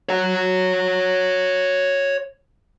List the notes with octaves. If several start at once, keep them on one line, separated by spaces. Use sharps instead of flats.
C#5 F#5